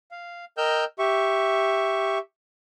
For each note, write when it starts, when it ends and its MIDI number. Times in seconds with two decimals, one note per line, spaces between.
0.11 0.45 77
0.57 0.84 70
0.57 0.84 75
0.57 0.84 79
0.57 0.84 88
0.57 0.84 89
0.57 0.84 91
0.99 2.18 67
0.99 2.18 76
0.99 2.18 85